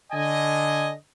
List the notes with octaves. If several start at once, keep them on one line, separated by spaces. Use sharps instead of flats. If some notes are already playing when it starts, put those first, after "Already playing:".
D3 D#5 G#5